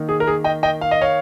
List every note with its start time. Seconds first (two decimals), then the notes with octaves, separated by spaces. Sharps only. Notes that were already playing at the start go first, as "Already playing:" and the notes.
Already playing: D#3 A#3 D#4
0.09 G#4
0.20 A#4
0.27 G#4
0.44 D#5 G5
0.63 D#5 G5
0.81 F5
0.91 D#5
1.01 C#5 F5